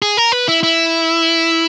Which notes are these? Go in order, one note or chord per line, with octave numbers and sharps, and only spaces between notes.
G#4
A#4
B4
E4
E4